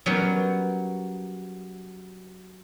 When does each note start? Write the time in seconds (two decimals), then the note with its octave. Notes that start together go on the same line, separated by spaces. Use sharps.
0.06 F#3 G3 B3 C#4 A#4